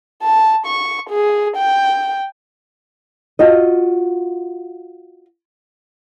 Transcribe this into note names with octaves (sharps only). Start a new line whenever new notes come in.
A5
C#6
G#4
G5
F4 F#4 D#5